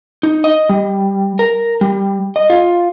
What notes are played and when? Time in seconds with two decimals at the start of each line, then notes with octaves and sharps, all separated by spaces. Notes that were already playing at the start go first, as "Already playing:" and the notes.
0.23 D#4
0.44 D#5
0.69 G3
1.39 A#4
1.81 G3
2.36 D#5
2.50 F4